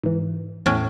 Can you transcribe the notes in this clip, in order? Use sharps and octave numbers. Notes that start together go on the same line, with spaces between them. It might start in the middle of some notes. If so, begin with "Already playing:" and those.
G#2 E3
E2 A2 C#4